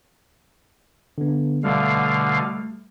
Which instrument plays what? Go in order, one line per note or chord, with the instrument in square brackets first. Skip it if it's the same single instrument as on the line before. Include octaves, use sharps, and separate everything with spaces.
[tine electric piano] D3 B3
[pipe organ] B2 D3 F5 [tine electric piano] G3 A3